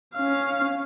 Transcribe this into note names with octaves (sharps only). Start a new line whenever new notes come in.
C#4 F5